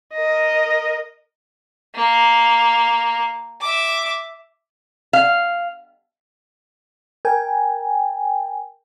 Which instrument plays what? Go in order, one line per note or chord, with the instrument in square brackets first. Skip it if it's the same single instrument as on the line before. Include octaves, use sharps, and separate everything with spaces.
[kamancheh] A#4 D#5
[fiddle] A#3
E5 D6
[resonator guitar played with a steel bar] F5
[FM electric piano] A#4 G5 G#5